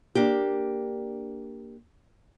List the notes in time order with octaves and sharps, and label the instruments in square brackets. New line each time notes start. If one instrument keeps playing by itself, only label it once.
[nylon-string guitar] A#3 D4 G4